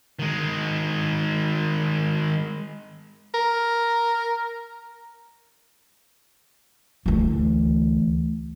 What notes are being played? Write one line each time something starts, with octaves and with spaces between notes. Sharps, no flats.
D#3 G#3
A#4
D2 E3